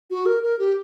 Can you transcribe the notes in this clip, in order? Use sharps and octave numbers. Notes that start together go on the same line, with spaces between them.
F#4
A#4
A#4
G4